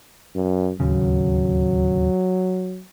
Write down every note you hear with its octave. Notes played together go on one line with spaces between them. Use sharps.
F#2
D1 D#2 C#3 F#3